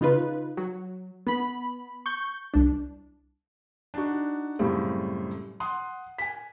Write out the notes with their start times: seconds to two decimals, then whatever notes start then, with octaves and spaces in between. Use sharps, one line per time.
0.01 C#3 D#4 F4 B4
0.57 F#3
1.27 B3 B5
2.06 C#6 G6
2.54 C2 D4
3.94 D4 D#4 F#4
4.59 F#2 A2 C#3 G3 C4
5.60 F#5 C6 D#6
6.18 G#5 B6